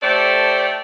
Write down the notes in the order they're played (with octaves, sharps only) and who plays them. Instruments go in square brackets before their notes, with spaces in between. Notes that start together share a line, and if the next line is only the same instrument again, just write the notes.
[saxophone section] A3 G4 A4 C5 D5